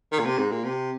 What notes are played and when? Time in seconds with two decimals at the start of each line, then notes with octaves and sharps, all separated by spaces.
0.12 D#3
0.19 A#2
0.25 C3
0.38 G#2
0.51 A#2
0.64 C3